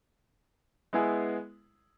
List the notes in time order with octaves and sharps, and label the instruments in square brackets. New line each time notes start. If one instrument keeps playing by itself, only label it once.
[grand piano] G#3 B3 E4 G#4